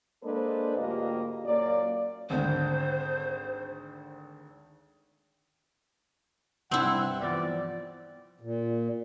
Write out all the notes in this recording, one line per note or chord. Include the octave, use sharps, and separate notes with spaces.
G#3 A#3 D4 A4 B4 C5
D2 G#2 A#3 F4 G4 D#5
F#2 A#2 A#3 D5
G#1 D2 G#2 C5
G2 C3 C4 E4 F#5
E3 F3 B3 D5
A#2